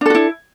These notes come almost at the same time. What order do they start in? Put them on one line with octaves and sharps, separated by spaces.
D4 A4 F#4 E4